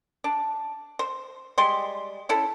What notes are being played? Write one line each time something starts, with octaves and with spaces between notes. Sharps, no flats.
D4
C5
G3 G#3 C6
C#4 E4 A4